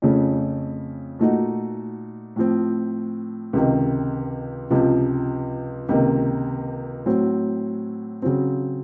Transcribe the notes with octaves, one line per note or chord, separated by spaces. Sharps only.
F2 C#3 A3 C#4
A#2 A3 D#4 F#4
A2 F3 C4
C#2 C3 D#3
C#2 C3 F3
C#2 C3 D#3 A#3
A2 F#3 C4
C#3 F#3 C4